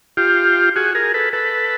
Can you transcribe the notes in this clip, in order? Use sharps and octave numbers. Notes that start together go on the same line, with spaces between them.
F4 G4
F#4 G#4
G#4 A#4
A4 B4
A4 B4